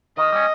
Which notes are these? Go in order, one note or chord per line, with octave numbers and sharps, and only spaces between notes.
D#3 D#5
G3 C#4